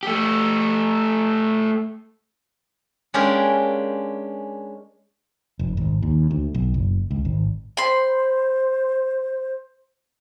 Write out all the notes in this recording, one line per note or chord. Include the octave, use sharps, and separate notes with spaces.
A3 G4
G#3 A#3 C#4 D4 G4 A#4
F1
G#1
D#2
D2
B1
F#1
C#2
G#1
C5 B5 C6